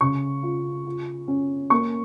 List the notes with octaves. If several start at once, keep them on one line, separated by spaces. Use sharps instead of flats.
C#3 C#6
F4
F4
C#4
A#3 C#6